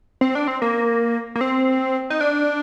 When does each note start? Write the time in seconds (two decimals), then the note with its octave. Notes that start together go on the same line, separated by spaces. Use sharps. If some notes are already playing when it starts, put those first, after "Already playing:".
0.21 C4
0.35 D4
0.47 C4
0.62 A#3
1.35 A#3
1.41 C4
2.10 D#4
2.21 D4